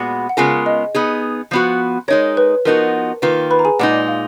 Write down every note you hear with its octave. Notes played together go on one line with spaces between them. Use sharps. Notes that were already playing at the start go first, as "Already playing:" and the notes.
Already playing: A#2 G#3 B3 F#4
F#5
C#3 G#3 B3 F4 G#4 A#4 G#5
D#5
B3 D#4 G#4
F3 B3 F#4
G#3 D#4 A#4 C#5
B4
F3 B3 D#4 F#4 A#4
D#3 A#3 F4 B4
B4 B5
A#5
G#4 G#5
A#2 G#3 D#4 F#5
F5